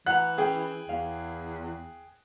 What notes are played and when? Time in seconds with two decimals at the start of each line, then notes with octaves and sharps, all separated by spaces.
0.06 E3 F#5 A#5 F#6
0.38 C#4 G#4 G5
0.89 E2 F5